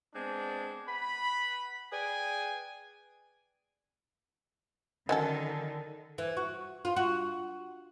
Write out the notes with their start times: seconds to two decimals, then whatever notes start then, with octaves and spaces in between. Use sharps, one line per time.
0.14 G#3 B3 C4 D4
0.88 B4 F#5 B5
1.92 G#4 B4 D5 G5 G#5
5.09 D3 D#3 F#3 C#4 D#4 A4 A#4 D#5
6.18 E3
6.37 F#4
6.85 F4
6.96 F#4